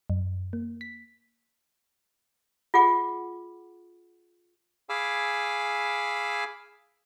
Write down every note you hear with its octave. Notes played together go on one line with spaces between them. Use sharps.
F#2
A#3
B6
F4 G#4 F#5 D6
G#4 F5 G#5 B5 D6 E6